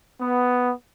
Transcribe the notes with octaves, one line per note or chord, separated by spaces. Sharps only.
B3